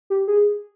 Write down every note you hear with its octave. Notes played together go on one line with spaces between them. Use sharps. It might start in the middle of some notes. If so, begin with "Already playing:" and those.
G4
G#4